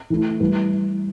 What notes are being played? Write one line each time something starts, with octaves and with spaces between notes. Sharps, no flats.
E3 A3 E4
E3 G3 E4 B4